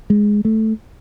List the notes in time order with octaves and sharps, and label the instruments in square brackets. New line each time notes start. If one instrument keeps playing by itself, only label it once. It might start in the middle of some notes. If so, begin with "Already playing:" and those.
[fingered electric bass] G#3
A3